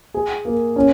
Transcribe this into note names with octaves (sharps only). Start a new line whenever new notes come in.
G#4
A#3
C#4